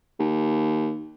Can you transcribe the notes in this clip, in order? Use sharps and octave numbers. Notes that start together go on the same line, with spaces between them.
D#2